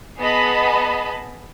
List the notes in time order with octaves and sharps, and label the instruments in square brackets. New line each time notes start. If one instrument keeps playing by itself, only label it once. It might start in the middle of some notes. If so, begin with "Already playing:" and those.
[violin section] B3 G#4 D#5 A5 B5